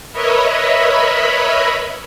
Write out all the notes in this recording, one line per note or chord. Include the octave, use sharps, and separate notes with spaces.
A#4 B4 C#5 D#5 E5 B5